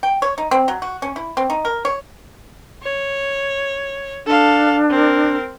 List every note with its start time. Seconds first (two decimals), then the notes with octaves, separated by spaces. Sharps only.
0.03 G5
0.22 C#5
0.38 D#4
0.51 C4
0.68 F#3
0.82 F#4
1.02 C#4
1.16 E4
1.37 C4
1.50 D#4
1.65 A#4
1.85 C#5
2.83 C#5
4.26 D4 A4 F5
4.90 C4 A#4